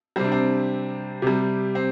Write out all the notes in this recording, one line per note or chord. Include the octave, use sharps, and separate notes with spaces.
C3 G3 C4 D4
C4
C3 G3
C4